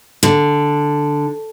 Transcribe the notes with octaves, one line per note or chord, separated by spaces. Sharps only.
D3